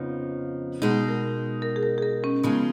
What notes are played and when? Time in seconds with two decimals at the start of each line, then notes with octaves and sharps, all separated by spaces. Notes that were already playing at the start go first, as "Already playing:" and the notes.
Already playing: F2 C#3 F3 B3 D#4
0.82 B2 G#3 D#4 G#4
1.08 A#4
1.62 A#4
1.76 G#4
1.83 A#4
1.98 G#4
2.02 A#4
2.24 C#4
2.43 C#3 F3 G#3 B3 D#4